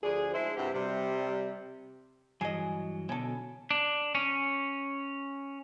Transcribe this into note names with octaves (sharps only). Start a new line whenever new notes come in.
D2 F3 D4 G#4
G#3 D4 E4 C5
G2 C3 C4 E4 F#4 G4
C3 G3
G2 E3 F#3 G#4 D#5
B2 D3 C#4 A4
D4
C#4